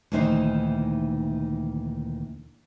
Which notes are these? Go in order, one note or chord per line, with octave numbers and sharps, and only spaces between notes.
D2 A#2 D#3 E3 D#4 C5